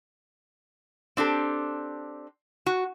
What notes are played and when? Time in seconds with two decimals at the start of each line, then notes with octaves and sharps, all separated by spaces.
1.17 C4 D4 G4 A4
2.66 F#4